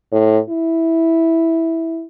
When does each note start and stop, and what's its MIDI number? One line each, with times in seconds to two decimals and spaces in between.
0.12 0.39 45
0.50 2.05 64